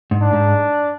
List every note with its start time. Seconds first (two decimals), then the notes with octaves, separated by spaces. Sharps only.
0.11 G#2
0.22 D4
0.33 G#2